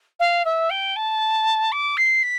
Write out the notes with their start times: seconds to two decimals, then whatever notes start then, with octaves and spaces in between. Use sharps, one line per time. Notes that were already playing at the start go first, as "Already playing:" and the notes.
0.20 F5
0.45 E5
0.70 G5
0.96 A5
1.72 D6
1.97 C7
2.23 B6